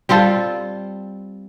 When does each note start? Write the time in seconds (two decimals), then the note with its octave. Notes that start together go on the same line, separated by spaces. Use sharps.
0.09 G3 C4 F4 A4